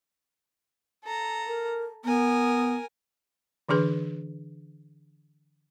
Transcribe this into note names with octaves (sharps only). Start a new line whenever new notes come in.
A4 A#5
A#4
B3 A#4 G#5
D3 E3 D4 G#4 B4